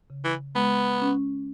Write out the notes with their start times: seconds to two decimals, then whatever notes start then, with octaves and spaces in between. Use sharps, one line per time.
0.10 C#3
0.25 E3
0.55 G#3 B3
1.02 C#4